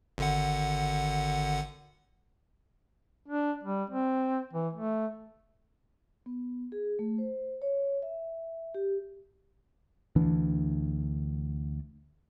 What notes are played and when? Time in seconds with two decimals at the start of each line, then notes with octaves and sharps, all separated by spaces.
0.18 G#1 D3 F#5
3.27 D4
3.64 G3
3.90 C4
4.53 E3
4.73 A3
6.26 B3
6.72 G#4
6.99 A3
7.18 C5
7.62 C#5
8.02 E5
8.75 G4
10.16 D2 E3 D4